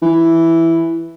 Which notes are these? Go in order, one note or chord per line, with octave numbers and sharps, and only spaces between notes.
E3